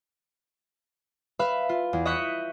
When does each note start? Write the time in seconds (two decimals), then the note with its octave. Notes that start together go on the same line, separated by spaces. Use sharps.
1.39 B4 E5 F5 B5
1.69 F4
1.93 E2
2.05 D#5 E5 C#6 F#6 G6 B6